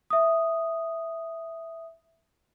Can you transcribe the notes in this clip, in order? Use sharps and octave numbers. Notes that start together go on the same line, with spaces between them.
E5 D#6